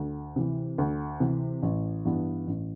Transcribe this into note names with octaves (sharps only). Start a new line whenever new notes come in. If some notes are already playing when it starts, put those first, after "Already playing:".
Already playing: D2
C3 E3
D2
C3 E3
A1
G2 E3 B3
A1